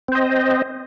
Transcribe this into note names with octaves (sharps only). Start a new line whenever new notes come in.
C4 C5 D#5